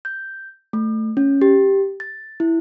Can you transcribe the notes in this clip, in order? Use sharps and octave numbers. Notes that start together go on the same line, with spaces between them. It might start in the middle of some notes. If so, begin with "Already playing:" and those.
G6
A3
C#4
G4
A6
E4